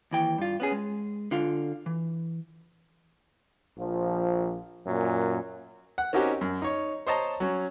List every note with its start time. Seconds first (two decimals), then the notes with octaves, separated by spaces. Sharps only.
0.11 D#2 E3 G5
0.38 G2 F4
0.60 B3 C#4 G#4
0.72 G#3
1.31 D3 F4 F5
1.86 E3
3.78 A#1 F3
4.87 F#2 A#2
5.98 F#5
6.13 C4 C#4 D#4 F#4 G4 A#4
6.41 F#2
6.62 D#4 C#5
7.07 C5 C#5 D#5 A5 A#5
7.40 F#3 C#4